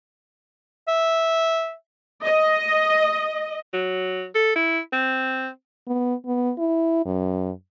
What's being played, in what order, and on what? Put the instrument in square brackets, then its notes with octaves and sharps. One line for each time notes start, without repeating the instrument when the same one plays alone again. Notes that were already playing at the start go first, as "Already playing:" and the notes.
[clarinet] E5
[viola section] D#5
[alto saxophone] F#3
A4
E4
C4
[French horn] B3
B3
E4
F#2